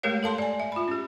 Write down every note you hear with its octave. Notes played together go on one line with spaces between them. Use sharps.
G#3 A3 G4 A#4 C#5 F5
A4 F5 A5 C6
D5 G#5
E5
F4 B5
C#4 G4